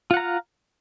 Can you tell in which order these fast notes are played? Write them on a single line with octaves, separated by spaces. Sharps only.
F4 F#5 A#5 F5